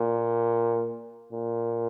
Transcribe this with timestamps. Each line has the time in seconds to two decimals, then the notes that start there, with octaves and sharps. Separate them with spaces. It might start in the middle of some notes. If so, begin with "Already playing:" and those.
Already playing: A#2
1.32 A#2